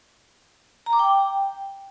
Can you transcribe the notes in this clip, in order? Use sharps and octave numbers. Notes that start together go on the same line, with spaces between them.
A#5
D6
G5